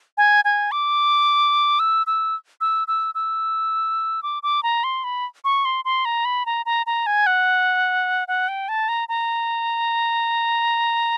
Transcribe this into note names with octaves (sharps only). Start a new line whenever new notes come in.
G#5
G#5
D6
E6
E6
E6
E6
E6
D6
D6
A#5
C6
B5
C#6
C6
C6
A#5
B5
A#5
A#5
A#5
G#5
F#5
F#5
G5
A5
A#5
A#5